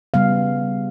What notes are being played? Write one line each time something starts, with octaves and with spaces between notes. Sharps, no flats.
C#3 G3 B3 F5